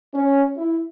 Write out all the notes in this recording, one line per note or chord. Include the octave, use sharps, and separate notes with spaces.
C#4
E4